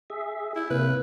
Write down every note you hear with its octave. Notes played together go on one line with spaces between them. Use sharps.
G#4 E5
E4
C3 A#3 B4